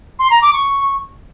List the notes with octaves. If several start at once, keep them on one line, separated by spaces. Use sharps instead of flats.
C6
A#5
D6
C#6